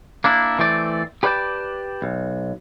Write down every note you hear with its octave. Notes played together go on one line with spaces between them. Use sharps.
A#3 D4 E4
E3 A3 C4 D5
G4 B4 D5 F#5 G5 A5
B1